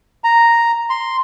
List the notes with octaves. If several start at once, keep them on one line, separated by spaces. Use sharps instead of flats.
A#5
C6